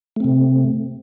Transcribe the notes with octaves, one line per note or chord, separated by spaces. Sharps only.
C3 A3 C4